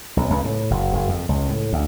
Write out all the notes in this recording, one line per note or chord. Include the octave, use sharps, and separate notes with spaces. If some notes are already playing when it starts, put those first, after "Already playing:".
B1
C#2
A2
F#1
F#1
F2
C#2
A2
D2